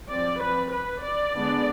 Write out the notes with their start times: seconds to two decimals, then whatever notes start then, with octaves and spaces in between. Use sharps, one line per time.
0.10 F3 C4 D5
0.41 B4
0.72 B4
1.03 D5
1.35 D3 G#3 B3 D4